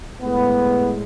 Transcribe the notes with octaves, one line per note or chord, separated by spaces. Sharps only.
A2 G#3 B3